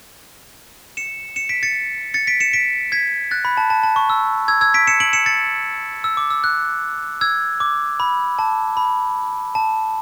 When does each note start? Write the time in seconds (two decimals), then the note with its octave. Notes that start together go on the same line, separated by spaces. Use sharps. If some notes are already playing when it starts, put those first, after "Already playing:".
0.97 C#7 E7
1.36 C#7 E7
1.49 B6 D7
1.63 A6 C#7
2.14 A6 C#7
2.27 B6 D7
2.40 C#7 E7
2.53 B6 D7
2.92 G#6 B6
3.31 F#6 A6
3.45 B5
3.57 A5
3.70 A5
3.83 A5
3.96 C#6
4.10 E6
4.48 E6 G#6
4.61 E6 G#6
4.74 B6 D7
4.87 C#7 E7
5.00 D7 F#7
5.13 C#7 E7
5.26 A6 C#7
6.04 E6
6.17 D6
6.30 E6
6.44 F#6
7.21 E6 G#6
7.60 D6
8.00 B5
8.39 A5
8.77 B5
9.55 A5